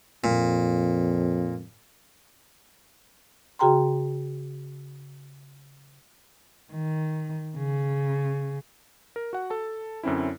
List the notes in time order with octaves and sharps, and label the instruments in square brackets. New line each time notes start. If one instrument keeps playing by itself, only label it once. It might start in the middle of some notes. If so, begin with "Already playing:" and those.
[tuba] F2 [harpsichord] A#2
[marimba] C#3 F#4 G#4 G5 A#5 C6
[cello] D#3
C#3
[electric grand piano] A#4
F#4 F#5
A4 A5
F#2 D3 C4 C#4 E4